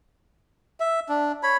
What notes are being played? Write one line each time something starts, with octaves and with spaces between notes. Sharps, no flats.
E5
D4
C#5 B5